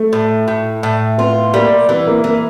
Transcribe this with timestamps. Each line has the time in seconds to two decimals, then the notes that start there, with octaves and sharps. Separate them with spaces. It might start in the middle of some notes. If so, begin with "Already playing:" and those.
Already playing: A3
0.13 A2
0.48 A2
0.83 A2
1.18 B3 F4
1.54 G3 A#3
1.89 E3 B3
2.07 A#3
2.24 E3 A#3